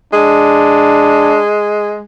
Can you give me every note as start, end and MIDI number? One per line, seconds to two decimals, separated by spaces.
0.13 2.00 56
0.13 1.41 62